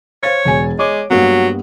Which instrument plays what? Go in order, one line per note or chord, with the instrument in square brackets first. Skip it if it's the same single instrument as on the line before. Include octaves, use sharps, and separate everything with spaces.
[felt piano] C5 F5 A6 [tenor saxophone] C#5
[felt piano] E1 G#5
[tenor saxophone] G#3 [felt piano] C#5 D6
[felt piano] G2 A#3 B3 [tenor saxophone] F#3